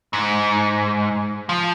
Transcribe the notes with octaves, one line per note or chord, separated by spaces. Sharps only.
G#2
F3